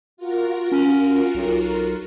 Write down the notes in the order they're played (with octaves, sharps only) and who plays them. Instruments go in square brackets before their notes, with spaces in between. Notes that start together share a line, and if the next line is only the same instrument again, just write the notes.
[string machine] F4 F#4 A#4
[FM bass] C#4
B1